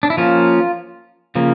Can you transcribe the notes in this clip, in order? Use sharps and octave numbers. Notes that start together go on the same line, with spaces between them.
D4
E4
F3 A#3 C#4 F4
C#3 F3 A#3